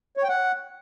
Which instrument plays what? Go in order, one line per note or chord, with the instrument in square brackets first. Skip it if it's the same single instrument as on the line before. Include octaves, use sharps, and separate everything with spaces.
[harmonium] C#5
G5
F#5